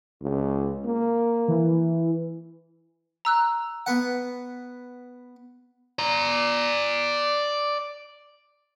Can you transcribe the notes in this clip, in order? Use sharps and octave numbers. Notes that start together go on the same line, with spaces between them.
C#2
A#3
E3
A#5 E6 F#6
B3 F#5
D5 A#5